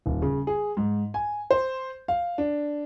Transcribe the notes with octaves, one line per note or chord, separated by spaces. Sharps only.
D#1
C#3
G#4
G#2
G#5
C5
F5
D4